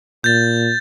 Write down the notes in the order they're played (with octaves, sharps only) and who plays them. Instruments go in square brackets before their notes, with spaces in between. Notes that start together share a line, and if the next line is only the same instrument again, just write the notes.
[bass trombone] A#2 [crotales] G6 A6